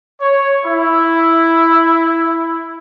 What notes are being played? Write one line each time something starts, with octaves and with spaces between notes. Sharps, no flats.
C#5
E4